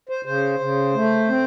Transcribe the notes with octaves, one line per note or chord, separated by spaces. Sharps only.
C5
C#3 C5
C#3
A3
C4